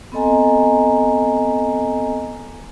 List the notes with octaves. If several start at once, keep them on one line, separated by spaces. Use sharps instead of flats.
B3 C4 A4 D#5 G#5 A#5